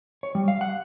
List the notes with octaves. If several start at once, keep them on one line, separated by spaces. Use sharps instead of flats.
C#5
G3
F5
F#5